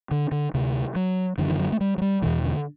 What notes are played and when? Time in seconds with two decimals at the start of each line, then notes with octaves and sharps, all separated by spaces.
0.11 D3
0.31 D3
0.54 D2 C3
0.95 F#3
1.38 F#2 D3 E3
1.49 E3
1.59 F#3
1.72 A3
1.80 G3
1.98 F#3
2.02 G3
2.22 E2 B2 E3
2.44 D3